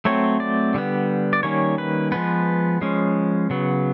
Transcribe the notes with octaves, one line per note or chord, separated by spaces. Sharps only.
F#3 A3 C4 C#5
D5
D3 G3 B3
D5
D#3 G3 A#3 C#4 C#5
B4
F3 G#3 B3 B4
F3 G#3 C#4
C#3 F#3 B3